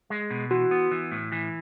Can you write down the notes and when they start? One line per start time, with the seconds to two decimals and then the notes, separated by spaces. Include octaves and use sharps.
0.10 G#3
0.30 B2
0.51 E3 F#4
0.71 B3
0.91 E3
1.11 A2
1.32 E3